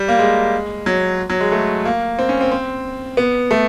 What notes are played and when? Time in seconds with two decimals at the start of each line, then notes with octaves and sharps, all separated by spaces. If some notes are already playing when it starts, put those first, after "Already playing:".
Already playing: G3
0.08 A#3
0.19 G#3
0.86 F#3
1.30 F#3
1.40 G#3
1.52 A3
1.85 A#3
2.19 C4
2.29 C#4
2.41 C4
2.51 C4
3.17 B3
3.51 A3